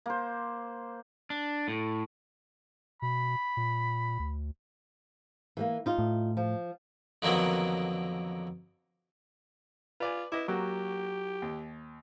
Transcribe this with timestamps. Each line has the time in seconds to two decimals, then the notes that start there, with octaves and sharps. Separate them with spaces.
0.06 A#3 C5
1.30 D4
1.68 A2
3.02 B2 B5
3.57 A#2
4.19 D2
5.57 E3 G3 A#3
5.86 D#4 F4
5.98 A2
6.37 F3
7.22 F2 D3 D#3 F#3 A#3 B3
10.00 F4 B4 D5 G#5
10.32 E4 B4 D#5 D6
10.48 F#3 A#3 F#4 G4
11.42 D#2